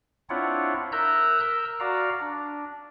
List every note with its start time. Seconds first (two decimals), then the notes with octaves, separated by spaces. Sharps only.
0.30 C4 D4 E4 F4 C#5 F#5
0.92 A#4 E5 A#5 E6 F#6 G6
1.40 A#4 E6
1.80 F#4 D5 F5 A#5
2.20 D4